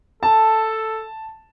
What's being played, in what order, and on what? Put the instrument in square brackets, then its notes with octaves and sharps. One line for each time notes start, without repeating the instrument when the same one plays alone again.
[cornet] A4 [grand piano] A5